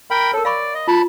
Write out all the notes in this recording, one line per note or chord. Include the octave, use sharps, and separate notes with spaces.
A#4 G5 B5
A4 A#4 C#5
D5 F5 B5 C#6
D#5
F4 A5 B5